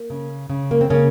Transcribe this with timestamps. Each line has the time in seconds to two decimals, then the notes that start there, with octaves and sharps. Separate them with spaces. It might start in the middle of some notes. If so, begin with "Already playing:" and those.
Already playing: A#3
0.10 C#3
0.50 C#3
0.71 A#3
0.81 C4
0.90 C#3 A#3 C#4